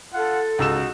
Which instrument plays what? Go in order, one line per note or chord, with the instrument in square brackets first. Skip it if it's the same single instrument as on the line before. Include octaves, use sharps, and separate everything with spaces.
[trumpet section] F4 F#5 [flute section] A4
[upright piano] C#2 E6 E7 [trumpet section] D#4 F#4